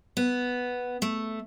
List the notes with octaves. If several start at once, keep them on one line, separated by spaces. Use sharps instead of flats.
B3
A3